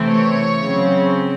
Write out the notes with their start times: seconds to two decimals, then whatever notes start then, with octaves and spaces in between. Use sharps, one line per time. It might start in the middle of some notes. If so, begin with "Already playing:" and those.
Already playing: C3 E3 A3 C4
0.08 C#5
0.58 C#3 F#3 C4